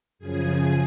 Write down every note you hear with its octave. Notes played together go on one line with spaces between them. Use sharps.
F#2 C#3 F3 G#4 G#5